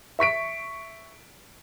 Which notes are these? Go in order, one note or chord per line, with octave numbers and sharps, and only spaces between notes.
E5 C#6 B6 D7